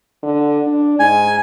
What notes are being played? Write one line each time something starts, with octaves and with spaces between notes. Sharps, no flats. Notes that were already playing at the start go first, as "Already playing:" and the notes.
D3
D4
G#2 G#5